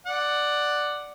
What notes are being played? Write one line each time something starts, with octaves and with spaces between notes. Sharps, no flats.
D5 F#5